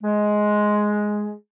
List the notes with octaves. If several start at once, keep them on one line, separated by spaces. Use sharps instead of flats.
G#3